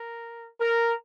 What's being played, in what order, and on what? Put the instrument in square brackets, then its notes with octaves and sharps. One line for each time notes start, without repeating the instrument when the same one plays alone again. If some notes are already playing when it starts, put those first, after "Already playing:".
Already playing: [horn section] A#4
A#4